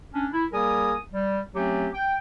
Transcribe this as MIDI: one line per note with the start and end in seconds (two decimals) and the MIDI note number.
0.13 0.27 61
0.13 0.27 62
0.32 0.45 64
0.52 0.95 55
0.52 0.95 58
0.52 0.95 68
0.52 0.95 70
0.52 0.95 80
0.52 0.95 87
1.14 1.39 55
1.54 1.89 54
1.54 1.89 57
1.54 1.89 60
1.54 1.89 61
1.54 1.89 67
1.95 2.18 79